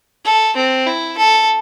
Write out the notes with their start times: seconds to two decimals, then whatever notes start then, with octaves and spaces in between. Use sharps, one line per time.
0.24 A4
0.56 C4
0.86 E4
1.17 A4